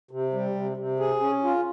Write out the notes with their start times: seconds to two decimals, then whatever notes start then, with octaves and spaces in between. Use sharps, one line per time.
0.11 C3
0.33 G3
0.55 C3
0.77 C3
1.00 G#4
1.21 C#4
1.44 F4